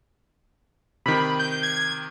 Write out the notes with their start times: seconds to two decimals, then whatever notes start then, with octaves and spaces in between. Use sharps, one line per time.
1.06 C3 D#3 B5
1.39 G6
1.63 G#6